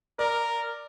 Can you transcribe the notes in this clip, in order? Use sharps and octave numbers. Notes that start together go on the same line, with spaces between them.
A#4 D5